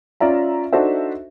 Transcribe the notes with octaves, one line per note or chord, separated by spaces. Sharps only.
C#4 F4 D5 E5 A#5
D4 D#4 F#4 A4 C5 E5